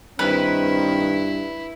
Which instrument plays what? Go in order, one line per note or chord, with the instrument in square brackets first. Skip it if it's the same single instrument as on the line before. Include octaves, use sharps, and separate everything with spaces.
[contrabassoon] G2 [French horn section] D#3 C4 [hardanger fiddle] E4 [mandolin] B4